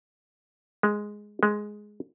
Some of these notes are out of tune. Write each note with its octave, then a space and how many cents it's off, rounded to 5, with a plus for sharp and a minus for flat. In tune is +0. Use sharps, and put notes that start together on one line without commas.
G#3 +0
G#3 +5